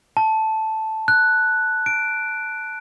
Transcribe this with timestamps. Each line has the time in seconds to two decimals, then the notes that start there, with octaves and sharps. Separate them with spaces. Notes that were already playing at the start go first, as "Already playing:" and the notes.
0.17 A5
1.08 F#6
1.86 D7